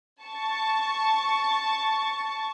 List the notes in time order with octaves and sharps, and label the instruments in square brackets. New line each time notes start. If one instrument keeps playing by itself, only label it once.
[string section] A5 C#6